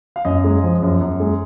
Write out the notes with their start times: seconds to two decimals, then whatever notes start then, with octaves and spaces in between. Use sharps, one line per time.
0.16 F5
0.25 F#2 D#5
0.44 G#3
0.63 F3
0.82 F#2
1.01 F#2
1.20 G#3